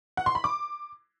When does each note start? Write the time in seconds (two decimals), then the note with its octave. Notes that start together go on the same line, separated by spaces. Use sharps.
0.17 F#5
0.26 C6
0.35 B5
0.44 D6